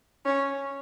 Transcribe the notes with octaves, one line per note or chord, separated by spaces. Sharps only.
C#4